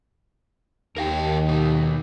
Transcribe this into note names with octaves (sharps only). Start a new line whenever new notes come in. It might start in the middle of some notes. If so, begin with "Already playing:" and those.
D#2 A#4 F5 G5
B2 D#4